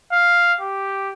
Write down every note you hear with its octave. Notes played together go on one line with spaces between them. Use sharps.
F5
G4